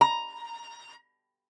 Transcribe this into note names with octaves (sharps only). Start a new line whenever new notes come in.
A#5